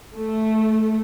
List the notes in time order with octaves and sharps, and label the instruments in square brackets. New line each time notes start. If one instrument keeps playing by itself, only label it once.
[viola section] A3